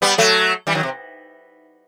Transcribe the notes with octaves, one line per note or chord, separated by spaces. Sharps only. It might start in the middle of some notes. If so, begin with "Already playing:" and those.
G3 B3
F#3 A3
E3 G3
D#3 F#3
C3